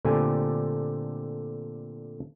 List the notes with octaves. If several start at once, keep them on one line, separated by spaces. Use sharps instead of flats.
A#2 D3 A3 C4 G4 G#5